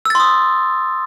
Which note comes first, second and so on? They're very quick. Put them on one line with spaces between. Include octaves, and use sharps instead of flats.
E6 A6 C6 D#6